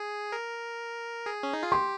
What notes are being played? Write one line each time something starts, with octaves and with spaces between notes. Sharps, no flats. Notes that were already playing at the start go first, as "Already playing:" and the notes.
Already playing: G#4
A#4
G#4
C#4
D#4
F4
G4 C6